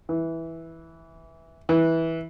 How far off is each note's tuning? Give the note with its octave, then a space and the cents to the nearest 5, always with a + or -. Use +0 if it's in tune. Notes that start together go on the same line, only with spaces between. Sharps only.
E3 -10
E3 -15